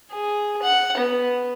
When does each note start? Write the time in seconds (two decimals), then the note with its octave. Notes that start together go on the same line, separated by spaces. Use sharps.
0.11 G#4
0.62 F#5
0.97 B3